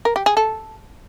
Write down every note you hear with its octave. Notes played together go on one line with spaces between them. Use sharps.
A#4
G4
G#4
A4